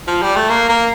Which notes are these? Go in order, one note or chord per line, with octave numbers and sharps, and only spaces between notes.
F3
G3
A3
A#3
A#3